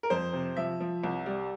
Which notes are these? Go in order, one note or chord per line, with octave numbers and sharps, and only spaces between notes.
A#4
F2 C5
C3
F3 E5
F3
C2
G3